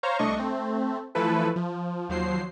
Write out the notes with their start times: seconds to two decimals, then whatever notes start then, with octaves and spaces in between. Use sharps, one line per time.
0.03 C5 C#5 F5 A#5
0.19 C2 A3 D4 D#5 C#6
0.37 A3 C4
1.15 E3 F3 A3 E4 A4 B4
1.56 F3
2.09 D#2 F3 F#3 C5 C7